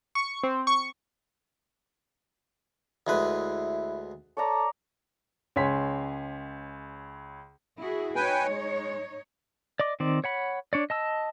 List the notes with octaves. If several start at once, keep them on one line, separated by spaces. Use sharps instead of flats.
C#6
C4
C#6
D2 G#3 E4 B4
A4 C#5 D5 A#5
C#2 C#5 G#5 C6 B6
E4 F#4 G#4
D#4 B4 C#5 G5 G#5
G#3
D5 D#5 D6
D#3 C4 D5
C#5 F#5 B5
D4 C#5 D5
D#5 A5 E6